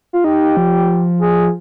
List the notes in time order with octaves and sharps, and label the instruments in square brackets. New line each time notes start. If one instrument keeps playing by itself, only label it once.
[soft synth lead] F4
[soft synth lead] D#4 [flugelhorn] G4
[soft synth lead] F3
[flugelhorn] G#4